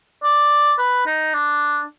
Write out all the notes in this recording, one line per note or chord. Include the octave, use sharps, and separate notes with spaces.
D5
B4
D#4
D4